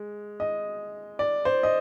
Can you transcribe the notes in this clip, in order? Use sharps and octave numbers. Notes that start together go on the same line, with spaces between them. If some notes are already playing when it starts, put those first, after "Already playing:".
Already playing: G#3
D#5
D5
C5
D#5